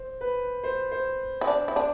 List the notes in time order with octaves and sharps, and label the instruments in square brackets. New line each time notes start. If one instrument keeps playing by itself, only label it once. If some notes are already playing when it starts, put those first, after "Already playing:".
Already playing: [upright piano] C5
B4
C5
C5
[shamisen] E4
D4
E4
D4